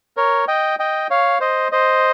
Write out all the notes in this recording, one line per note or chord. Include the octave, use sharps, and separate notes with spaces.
A#4 C#5
D#5 G5
D#5 G5
C#5 F5
C5 D#5
C5 D#5